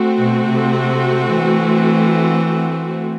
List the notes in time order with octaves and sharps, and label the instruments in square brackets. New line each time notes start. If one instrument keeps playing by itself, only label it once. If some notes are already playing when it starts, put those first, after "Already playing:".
Already playing: [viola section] A3 C4 F#4
[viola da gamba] B2
C3
E3